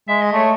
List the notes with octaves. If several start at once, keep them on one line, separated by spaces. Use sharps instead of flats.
G#3 E5
D#5
A3 C#5